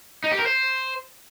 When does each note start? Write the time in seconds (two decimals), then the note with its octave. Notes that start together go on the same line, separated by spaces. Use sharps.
0.24 D#4
0.31 G4
0.39 A#4
0.46 C5